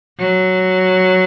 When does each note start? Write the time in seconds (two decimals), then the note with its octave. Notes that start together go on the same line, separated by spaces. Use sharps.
0.19 F#3